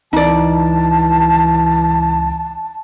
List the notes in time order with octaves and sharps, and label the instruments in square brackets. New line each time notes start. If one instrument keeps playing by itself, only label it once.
[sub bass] C#2 [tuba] E3 [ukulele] D#4 D5 [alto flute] A5